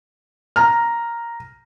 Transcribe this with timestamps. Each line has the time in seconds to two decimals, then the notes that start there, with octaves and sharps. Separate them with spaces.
0.56 A#5 F6